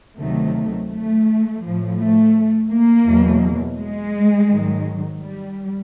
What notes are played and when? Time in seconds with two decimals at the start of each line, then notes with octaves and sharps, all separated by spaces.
0.18 D2 C3 D#3 F#3 A3
0.90 A3
1.63 A2 F3
1.98 A3
2.70 A#3
3.06 E2 B2 F#3
3.78 G#3
4.51 G#2 D#3 F#3
5.22 G3